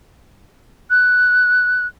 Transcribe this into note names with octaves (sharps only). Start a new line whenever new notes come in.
F#6